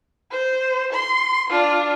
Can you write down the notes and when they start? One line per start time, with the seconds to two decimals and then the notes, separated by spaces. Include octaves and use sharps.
0.31 C5
0.93 C6
1.50 D4 F4